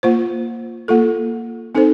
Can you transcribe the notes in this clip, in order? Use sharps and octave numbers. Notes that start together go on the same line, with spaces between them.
A#3 F4 C5
A#3 F4 A4
C4 D#4 A4 C5